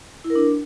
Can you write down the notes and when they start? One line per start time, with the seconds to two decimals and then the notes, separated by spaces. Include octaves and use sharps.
0.24 E4
0.30 A#4
0.35 D4